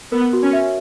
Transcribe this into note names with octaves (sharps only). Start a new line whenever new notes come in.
B3 A#4
F#4
C#4
E5